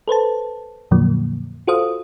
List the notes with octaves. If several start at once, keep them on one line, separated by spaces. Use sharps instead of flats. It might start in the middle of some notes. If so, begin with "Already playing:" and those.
A4 B4 C5 A5
F2 A#2 D3 F3 F#3 A#3
F4 F#4 A4 C5 F5 D#6